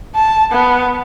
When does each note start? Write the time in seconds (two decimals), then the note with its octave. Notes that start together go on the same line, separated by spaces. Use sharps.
0.15 A5
0.52 B3